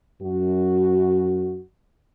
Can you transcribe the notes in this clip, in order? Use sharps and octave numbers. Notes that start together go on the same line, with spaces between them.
F#2 F#4